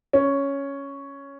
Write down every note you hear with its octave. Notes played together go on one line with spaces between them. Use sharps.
C#4